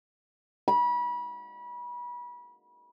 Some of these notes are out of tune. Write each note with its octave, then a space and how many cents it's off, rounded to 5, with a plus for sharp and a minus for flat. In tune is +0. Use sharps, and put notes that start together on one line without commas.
B5 -30